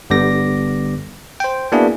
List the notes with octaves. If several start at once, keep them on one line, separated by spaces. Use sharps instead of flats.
G1 D3 G3 B3 D6 A#6
C5 G5
A#3 B3 D4 E4 F#4 G#4